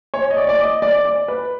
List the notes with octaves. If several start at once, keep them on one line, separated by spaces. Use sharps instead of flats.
C#5
D#5
D5
D5
D#5
D5
D5
B4